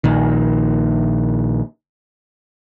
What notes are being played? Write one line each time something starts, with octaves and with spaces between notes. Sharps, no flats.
A#1 A#2 D#3